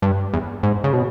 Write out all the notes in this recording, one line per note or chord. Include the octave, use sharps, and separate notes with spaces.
G2
E2
G#2
C#3
B2